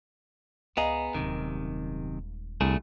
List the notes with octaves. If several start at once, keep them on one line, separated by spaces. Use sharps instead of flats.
C#2 B3 G#4 D#5 F5 A#5
D#1 F#2 C3 D#3 G#3
C2 A3 D4 G#4